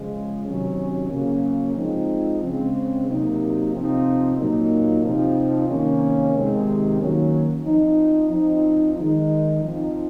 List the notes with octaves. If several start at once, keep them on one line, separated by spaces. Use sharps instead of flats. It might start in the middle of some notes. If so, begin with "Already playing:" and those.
Already playing: C#3 F3 G#3
C3 D#3 F#3 C#4
C#3 F#3 A#3 C#4
F3 G#3 C4 D#4
C#3 G#3 C4
C3 F#3 A#3 D#4
C3 F3 C4 D#4
A#2 F#3 A#3 D#4
C3 F3 C4 D#4
C3 D#3 A#3 C#4
C3 D#3 G#3 C4
D#3 F#3 A#3 C#4
F3 C4 D#4
F3 C4 D#4
D#3 G#3 D#4
F3 C4 D#4